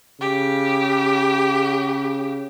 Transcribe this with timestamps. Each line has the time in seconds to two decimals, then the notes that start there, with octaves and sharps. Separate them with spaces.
0.21 C#3 G4